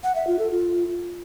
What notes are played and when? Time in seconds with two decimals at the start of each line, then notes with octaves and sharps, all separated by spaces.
0.04 F#5
0.15 E5
0.27 F4
0.39 A4
0.51 F4